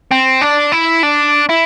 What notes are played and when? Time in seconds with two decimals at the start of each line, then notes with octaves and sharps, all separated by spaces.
0.11 C4
0.41 D4
0.72 E4
1.03 D4
1.49 E4